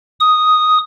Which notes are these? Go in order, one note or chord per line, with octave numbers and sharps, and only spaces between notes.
D#6